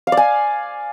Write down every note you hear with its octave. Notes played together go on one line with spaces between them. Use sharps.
F5
D5
G#5